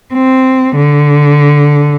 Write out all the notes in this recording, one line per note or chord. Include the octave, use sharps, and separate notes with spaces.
C4
D3